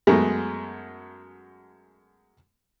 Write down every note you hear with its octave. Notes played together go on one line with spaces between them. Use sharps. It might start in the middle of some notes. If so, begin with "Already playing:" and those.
F#2 G#3 A3 B3